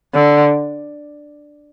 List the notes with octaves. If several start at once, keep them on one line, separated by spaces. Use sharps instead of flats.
D3